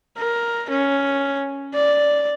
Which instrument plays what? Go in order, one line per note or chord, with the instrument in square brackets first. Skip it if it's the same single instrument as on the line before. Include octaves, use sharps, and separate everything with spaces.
[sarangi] A#4
C#4
D5